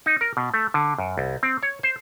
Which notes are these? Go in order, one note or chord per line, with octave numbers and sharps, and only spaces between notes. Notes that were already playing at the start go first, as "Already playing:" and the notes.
D#4
A#4
B2
A3
D3
F#2
C2
C4
C#5
C5